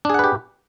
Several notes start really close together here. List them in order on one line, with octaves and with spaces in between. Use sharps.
D4 G#4 F#5 B4 G4